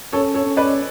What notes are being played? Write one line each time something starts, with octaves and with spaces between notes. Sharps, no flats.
C#4 A4 C#5
A4 C#5
C#4
B4 D5